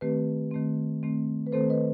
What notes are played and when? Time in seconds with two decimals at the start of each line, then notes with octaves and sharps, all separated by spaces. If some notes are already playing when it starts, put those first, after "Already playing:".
0.01 D#3 A3 C4 G4 B4
0.51 D#3 A3 C4
1.03 D#3 A3 C4
1.47 B4
1.52 D#3 A3 C4 A4 C5
1.70 B4 D#5